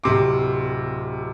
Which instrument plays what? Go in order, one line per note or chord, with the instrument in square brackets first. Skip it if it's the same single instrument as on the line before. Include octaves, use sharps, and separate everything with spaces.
[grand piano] D1 C3 C6 D6